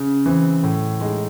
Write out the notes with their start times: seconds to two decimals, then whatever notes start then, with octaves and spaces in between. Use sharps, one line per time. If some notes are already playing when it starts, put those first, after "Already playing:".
Already playing: C#3
0.26 E3 C4
0.63 A2
1.01 G#3 D#4